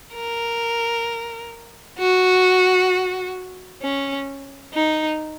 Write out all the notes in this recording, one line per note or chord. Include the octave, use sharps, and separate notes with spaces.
A#4
F#4
C#4
D#4